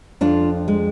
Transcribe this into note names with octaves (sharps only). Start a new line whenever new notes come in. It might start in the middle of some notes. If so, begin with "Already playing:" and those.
F2 D4 F4
G#3